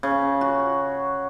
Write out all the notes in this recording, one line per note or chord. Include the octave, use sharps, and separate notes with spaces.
C#3
F#4